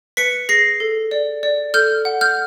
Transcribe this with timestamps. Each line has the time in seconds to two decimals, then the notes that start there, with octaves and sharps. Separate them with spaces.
0.17 B4 B6 C#7
0.49 G#4 A#6 C7
0.80 A4
1.11 D5
1.43 D5
1.74 A4 F6 G6
2.05 F#5
2.21 F6 G6